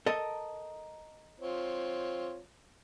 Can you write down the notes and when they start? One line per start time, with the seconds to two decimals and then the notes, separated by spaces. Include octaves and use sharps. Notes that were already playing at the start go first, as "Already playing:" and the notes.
0.06 A4 A#4 D#5
1.40 C4 F4 C#5